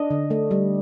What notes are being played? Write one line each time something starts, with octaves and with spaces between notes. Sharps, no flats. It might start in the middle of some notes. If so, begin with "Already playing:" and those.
Already playing: D4 D#5
D3
A3
G3